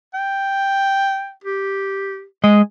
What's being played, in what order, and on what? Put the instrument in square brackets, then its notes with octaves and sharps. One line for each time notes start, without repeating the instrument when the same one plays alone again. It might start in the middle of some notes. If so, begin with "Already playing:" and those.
[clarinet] G5
G4
[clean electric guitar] G#3 D#5 [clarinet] G#5